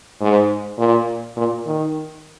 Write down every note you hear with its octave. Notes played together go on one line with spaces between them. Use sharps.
G#2
A#2
A#2
D#3